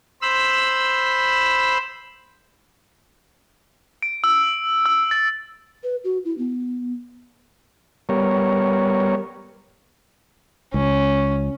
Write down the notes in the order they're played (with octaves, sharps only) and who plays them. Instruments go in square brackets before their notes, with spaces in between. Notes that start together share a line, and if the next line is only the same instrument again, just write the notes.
[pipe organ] C5 B5 E6
[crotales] D7
E6
E6
A6
[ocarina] B4
F#4
E4
B3
[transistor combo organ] G3 B3 A#4 C#5
[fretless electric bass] C#2 [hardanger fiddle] C#4